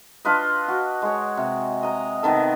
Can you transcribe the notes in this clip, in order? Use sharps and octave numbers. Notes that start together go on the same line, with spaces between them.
D4 F4 B4 D#5
F#4
G#3 C#5
C3
D#5 A#5
C3 D#3 B3 A4